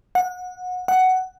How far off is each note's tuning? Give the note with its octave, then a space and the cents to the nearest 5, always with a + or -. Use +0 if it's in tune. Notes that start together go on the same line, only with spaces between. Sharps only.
F#5 -25
F#5 +10